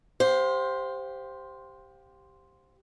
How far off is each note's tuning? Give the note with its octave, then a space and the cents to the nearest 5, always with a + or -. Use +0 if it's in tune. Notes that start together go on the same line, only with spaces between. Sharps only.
G4 +0 C5 +0 F5 +35